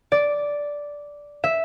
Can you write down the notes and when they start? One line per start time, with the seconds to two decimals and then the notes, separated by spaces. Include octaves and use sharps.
0.12 D5
1.44 E5